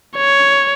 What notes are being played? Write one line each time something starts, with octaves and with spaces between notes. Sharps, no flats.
C#5